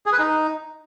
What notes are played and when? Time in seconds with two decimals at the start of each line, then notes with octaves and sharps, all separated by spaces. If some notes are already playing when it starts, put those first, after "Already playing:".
0.06 G#4
0.13 B4
0.19 D#4